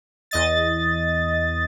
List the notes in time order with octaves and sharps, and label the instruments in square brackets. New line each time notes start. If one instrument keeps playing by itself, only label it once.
[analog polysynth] E2 D#5 A6